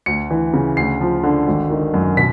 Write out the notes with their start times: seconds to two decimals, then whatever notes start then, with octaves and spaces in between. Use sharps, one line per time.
0.06 D2 C#7
0.31 E3
0.53 C#3
0.77 D2 C7
1.01 F3
1.23 D3
1.47 G#1
1.70 D#3
1.94 F#2
2.17 B2 B6